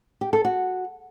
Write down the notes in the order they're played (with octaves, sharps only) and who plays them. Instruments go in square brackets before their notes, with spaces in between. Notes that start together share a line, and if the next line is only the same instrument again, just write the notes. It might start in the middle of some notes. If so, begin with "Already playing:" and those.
[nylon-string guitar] G4
A4
F#4